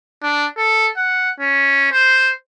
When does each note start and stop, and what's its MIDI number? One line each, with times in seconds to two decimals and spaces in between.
0.23 0.46 62
0.57 0.89 69
0.97 1.31 78
1.40 1.87 61
1.92 2.31 72